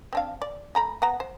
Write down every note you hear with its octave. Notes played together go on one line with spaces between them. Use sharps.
C4 D4 F5
D5
A3 A#5 B5
B3 F#5 A#5
C5